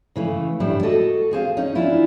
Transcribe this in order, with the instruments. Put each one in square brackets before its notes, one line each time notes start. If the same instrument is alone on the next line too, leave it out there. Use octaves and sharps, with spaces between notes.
[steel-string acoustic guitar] C#3 E3 A3
D2 A2 G3 D4 E4
F#4 A4 D#5
C4 G#4 C5 F5
C#4 D#4
E2 E3 D4 E4 F4